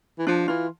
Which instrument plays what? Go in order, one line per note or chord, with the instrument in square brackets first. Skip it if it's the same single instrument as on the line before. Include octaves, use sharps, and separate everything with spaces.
[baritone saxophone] E3
[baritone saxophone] F3 [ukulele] D4
[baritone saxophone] E3 [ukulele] F4